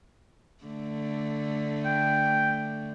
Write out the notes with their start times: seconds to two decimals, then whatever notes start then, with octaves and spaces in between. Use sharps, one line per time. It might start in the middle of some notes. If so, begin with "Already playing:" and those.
0.64 D3 A3
1.85 G5